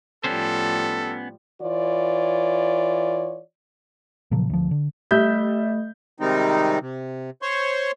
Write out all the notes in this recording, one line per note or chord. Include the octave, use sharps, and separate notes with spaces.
A2 F3 G3 B3 C#4 A4 C5
E3 F4 C#5 D5
A#2 C#3 F3 F#3
D2 F3
D3
G3 A3 E5 G6
C3 D#3 G3 G#3 C4 D#4
C3
C5 C#5 C6 C#6